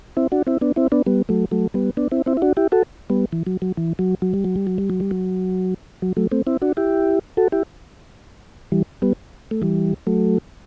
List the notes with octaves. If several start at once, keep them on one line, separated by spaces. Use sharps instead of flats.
C4 E4
D4 F#4
C4 E4
B3 D4
C4 E4
B3 D4
G3 B3
F#3 A3
F#3 A3
G3 B3
B3 D4
C4 E4
C4 E4
E4
D4 F#4
E4 G4
F#4 A4
G3 B3
E3
F#3
F#3
E3
F#3
F#3
G3
F#3
G3
F#3
G3
F#3
G3
F#3
F#3
F#3 A3
A3 C4
C4 E4
D4 F#4
E4 G4
F#4 A4
E4 G4
E3 G3
G3 B3
A3
E3 G3
F#3 A3